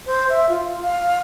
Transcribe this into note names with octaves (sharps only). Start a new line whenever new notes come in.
C5
E5
F4
F5